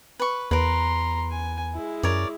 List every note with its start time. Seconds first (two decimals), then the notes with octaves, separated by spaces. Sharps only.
0.19 B4 C#6
0.51 E2 A#4 B4 A#5 C6
1.31 G#5
1.74 G#3 E4
2.03 F#2 A#4 C#5 D5